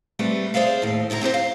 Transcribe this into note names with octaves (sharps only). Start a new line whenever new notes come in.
G3 A3 C4 B4
G#4 C5 D5 E5 F5
D#2 A2
D2 C3 E4 G#4 A#5
C4 G4 B4 C5
F5